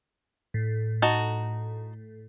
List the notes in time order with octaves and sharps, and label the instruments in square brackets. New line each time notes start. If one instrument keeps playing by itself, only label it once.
[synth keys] A2
[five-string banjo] D#4 F#4 A5